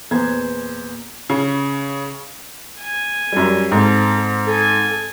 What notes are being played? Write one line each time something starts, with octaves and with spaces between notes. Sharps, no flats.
E2 A#2 B3 C5 A#5 G#6
C#3
G#5
F#2 G3
G#2 C4 A4
A4 G#5